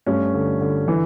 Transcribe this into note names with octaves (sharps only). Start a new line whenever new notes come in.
G2 A3 C#4
D3
D3
E3